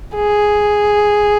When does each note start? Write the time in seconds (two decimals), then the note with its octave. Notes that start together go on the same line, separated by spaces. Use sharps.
0.16 G#4